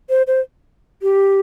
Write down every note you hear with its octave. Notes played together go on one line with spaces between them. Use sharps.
C5
C5
G4